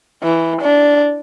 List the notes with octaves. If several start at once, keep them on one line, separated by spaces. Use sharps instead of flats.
E3
D4